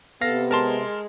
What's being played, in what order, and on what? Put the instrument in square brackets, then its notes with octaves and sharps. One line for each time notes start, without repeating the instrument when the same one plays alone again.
[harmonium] C3 [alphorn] B3 [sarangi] A4 [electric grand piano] F5 A#6
[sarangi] G#3 [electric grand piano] A#4 A5 C6